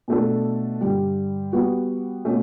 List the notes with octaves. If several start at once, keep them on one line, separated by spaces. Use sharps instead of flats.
B2 A3 D4 A4
G2 D3 G3
G3 B3 F#4
B2 A3 C#4